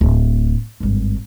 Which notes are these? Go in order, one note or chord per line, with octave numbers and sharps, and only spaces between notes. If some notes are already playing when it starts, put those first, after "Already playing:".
D1 D2
G#1 G2